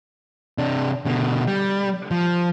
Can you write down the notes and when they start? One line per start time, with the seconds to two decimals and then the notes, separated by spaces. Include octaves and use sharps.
0.58 C3 D4
1.06 B2 D3
1.47 G3
2.11 F3